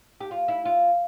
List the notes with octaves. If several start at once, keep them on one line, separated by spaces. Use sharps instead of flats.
G4
F4
E4
F4